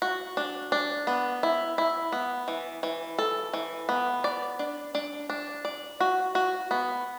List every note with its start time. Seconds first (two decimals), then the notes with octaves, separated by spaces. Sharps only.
0.02 F#4
0.37 D4
0.72 D4
1.07 B3
1.43 E4
1.78 E4
2.12 B3
2.48 E3
2.83 E3
3.19 A4
3.53 E3
3.89 B3
4.24 D5
4.59 D4
4.95 D4
5.30 D4
5.65 D5
6.00 F#4
6.35 F#4
6.71 B3